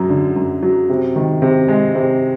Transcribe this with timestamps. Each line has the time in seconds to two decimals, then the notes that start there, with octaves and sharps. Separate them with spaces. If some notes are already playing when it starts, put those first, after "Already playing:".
Already playing: F#2 F#3
0.10 D3
0.36 F#2
0.63 F#3
0.89 C3
1.16 D#3
1.42 C3
1.68 G#3
1.95 C3